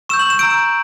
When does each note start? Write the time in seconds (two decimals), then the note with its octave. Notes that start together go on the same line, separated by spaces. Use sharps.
0.09 C#6 E6 G6 E7
0.19 F#7
0.30 E7
0.39 A#5 E6 G6 D7